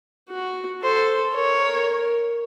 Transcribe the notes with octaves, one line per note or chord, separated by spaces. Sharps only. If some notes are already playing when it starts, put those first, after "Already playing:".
F#4
A4 C5
A#4 C#5